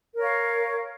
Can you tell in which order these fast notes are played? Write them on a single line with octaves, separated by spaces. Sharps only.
A#4 C#5 F5